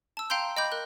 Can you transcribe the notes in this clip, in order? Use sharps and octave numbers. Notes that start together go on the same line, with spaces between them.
A5 E6
F5 G5 A#5 C6 G6
D#5 G5 B5 D6 G6
A#4 F#6